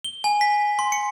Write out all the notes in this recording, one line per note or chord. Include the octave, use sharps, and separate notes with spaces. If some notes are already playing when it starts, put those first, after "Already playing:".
G7
G#5
B6
C6
C#7